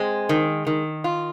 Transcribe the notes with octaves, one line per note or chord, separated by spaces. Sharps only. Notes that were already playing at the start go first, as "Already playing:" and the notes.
Already playing: G#3 C4
D#3
D#3
F4